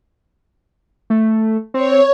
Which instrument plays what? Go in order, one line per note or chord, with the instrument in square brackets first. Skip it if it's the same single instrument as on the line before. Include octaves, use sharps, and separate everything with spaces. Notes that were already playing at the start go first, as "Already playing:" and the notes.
[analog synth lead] A3
[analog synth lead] C4 [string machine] C#5